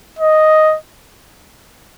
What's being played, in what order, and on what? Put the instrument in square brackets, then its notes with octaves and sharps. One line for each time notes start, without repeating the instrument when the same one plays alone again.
[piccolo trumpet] D#5